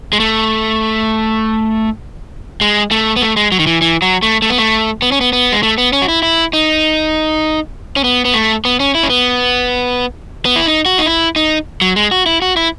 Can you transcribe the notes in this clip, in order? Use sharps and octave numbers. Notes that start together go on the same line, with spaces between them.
G#3
A3
G#3
A3
B3
A3
G#3
F#3
D#3
E3
E3
F#3
A3
A3
B3
A3
B3
C#4
B3
B3
G#3
A3
B3
C#4
F#4
E4
E4
D#4
C#4
B3
B3
A3
B3
C#4
E4
C#4
B3
B3
E4
D#4
F#4
D#4
E4
D#4
F#3
G#3
F#4
E4
F#4
E4